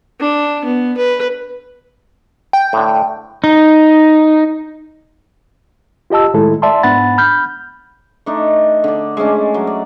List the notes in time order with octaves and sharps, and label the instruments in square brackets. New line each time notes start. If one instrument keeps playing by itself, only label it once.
[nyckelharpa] D4
B3
B4
[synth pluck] G5
[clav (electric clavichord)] A2 D3
[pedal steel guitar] D#4
[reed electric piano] F4 G4 D#5 A5 E6
A2 D#3 G#3 E4 A4
D5 E5 A5 C6
G#2 B3 D4 F#5 B5 A6
B5 F6 G6
[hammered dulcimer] A3 D4 D#4
D3 D5
G#3 A3 C#4 D4
F#3
D5